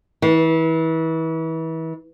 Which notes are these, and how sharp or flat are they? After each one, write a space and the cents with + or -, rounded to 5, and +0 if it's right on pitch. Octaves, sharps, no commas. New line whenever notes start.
E3 -30